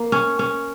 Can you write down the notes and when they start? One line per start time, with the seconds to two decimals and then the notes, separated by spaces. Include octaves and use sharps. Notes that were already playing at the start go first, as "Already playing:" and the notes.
Already playing: A#3
0.12 C#4
0.39 C#4